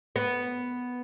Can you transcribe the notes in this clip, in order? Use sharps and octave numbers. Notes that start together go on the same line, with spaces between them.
B3